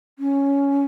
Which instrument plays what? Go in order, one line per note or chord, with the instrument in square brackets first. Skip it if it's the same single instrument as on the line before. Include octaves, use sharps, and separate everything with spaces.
[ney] C#4